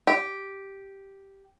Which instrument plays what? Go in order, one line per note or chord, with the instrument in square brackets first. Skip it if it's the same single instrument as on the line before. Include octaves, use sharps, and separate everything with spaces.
[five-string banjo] G4